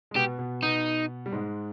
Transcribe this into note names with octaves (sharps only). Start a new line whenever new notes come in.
G#3
B2 B3 G4
B2 B3
B2 B3 D#4
G3
G#2 G#3